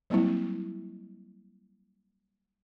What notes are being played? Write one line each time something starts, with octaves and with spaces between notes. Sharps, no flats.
F#3 G3 A#3 C4 E4